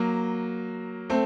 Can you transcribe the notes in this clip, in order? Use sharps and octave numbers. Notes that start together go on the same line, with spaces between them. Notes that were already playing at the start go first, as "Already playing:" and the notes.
Already playing: F#3 A#3
A3 C4